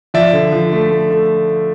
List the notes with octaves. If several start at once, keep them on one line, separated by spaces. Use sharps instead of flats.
F3 D5 E5
D3
F3
A3
A3
A3